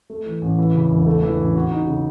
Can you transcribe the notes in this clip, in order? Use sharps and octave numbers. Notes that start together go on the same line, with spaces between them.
A3
E3
A1
E3
C#3
E1
A3
E3
A1
F#4
D#4
C#3